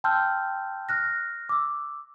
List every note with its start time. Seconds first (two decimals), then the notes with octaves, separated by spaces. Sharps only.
0.04 G5 A5 C6 E6 F6 G6
0.89 F6 F#6 A#6
1.49 D6 E6